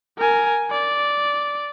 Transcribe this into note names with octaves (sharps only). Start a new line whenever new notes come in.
A#4 G#5
D5